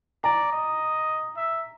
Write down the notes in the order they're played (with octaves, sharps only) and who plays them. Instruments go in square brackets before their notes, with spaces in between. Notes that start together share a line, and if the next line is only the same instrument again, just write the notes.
[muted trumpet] D5 [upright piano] A#5
[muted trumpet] D#5
E5